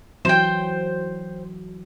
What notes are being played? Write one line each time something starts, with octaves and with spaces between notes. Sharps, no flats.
E3 F#3 C5 G5